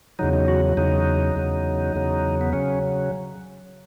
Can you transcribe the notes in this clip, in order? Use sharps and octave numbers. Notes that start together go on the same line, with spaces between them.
E2 C#3 F#3 D#4
D#4
F#4
E2 C#3 F#3 D#4
E2 C#3 F#3
E2 C#3 F#3
B3
C#3 F#3 C#4